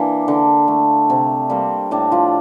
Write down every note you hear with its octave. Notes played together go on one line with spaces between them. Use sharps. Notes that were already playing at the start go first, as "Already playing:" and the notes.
Already playing: E3 A#3 D4
D3
A3
C3
G3 A#3 C4
A2 D4
F3 F4